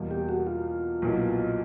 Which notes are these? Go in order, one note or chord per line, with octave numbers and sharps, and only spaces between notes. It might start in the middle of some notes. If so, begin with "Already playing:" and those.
Already playing: E2 B2 G3 A#3
G4
F#4
F4
B1 A#2 F#3 B3 E4